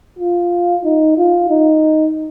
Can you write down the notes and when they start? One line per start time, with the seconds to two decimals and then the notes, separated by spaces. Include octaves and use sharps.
0.19 F4
0.84 D#4
1.17 F4
1.49 D#4